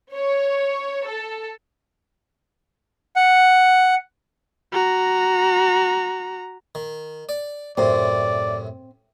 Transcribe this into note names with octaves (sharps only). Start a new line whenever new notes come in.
C#5
A4
F#5
F#4 A#5
D#3
D5
F#2 A2 C3 C4 D5